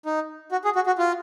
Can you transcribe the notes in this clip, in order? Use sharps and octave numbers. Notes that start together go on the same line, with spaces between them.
D#4
F#4
G#4
F#4
F#4
F4